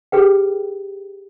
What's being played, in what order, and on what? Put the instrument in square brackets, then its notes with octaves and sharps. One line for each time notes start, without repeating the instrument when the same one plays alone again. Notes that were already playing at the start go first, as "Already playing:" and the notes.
[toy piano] G4 G#4 B4 G5